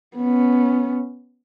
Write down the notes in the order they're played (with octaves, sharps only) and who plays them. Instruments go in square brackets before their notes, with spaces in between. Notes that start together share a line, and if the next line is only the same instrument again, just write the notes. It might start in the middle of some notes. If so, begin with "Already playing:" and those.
[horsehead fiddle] B3 C#4